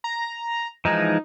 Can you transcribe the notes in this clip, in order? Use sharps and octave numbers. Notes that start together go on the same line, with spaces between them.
A#5
E3 F3 G#3 D#4